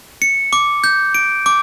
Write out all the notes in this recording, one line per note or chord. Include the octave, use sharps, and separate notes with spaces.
C#7
D6
G6
D7
D6